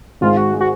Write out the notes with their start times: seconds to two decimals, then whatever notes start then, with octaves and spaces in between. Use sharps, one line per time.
0.21 G#1 G#2 G#3 F4
0.37 F#4
0.53 G#3
0.61 F#4